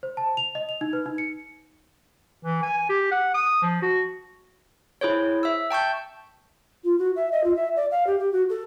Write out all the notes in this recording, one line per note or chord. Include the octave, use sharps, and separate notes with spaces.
C5
A5
F7
D#5
F7
D#4
B4
D#4
C#7
E3
G#5
G4
F#5
D#6
F3
F#4
E4 G#4 C5 C#5
E5 E6
G5 A5 C#6 G6
F4
F#4
E5
D#5
F4
E5
D5
F5
G4
G4
F#4
A4